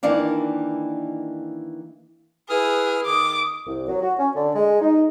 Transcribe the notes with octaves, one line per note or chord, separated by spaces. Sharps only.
D#3 E3 A#3 D4 D5 F5
E4 G#4 B4 D#6 F6
D#3 D6 D#6
C2
F#3
F#4
C#4
D3
G#3
D#4